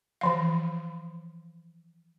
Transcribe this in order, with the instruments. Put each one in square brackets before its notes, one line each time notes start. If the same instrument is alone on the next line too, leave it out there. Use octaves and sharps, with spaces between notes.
[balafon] E3 F3 F5